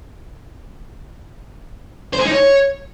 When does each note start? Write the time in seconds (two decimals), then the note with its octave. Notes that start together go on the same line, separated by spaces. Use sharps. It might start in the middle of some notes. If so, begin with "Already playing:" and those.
2.13 C5
2.19 G#4
2.26 D#4
2.32 C#5